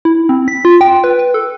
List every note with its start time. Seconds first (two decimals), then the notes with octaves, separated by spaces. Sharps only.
0.05 E4
0.29 C4
0.48 B6
0.65 F4
0.81 G5
1.04 B4
1.19 B4
1.34 A4